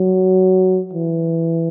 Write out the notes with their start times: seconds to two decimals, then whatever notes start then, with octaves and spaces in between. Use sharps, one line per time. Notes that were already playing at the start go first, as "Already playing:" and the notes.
Already playing: F#3
0.93 E3